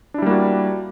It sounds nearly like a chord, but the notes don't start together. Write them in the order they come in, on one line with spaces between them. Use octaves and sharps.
D4 E4 G3 A#3 F#4